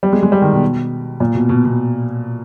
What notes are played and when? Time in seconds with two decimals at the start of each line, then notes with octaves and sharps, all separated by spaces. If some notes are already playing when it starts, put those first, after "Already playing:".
0.03 G3
0.13 G#3
0.23 G#3
0.32 G3
0.42 D#3
0.53 B2
1.20 A#2
1.35 B2
1.49 B2
1.65 B2